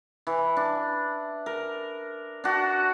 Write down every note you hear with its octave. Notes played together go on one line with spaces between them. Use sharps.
E3
D4
A#4
D4 F#4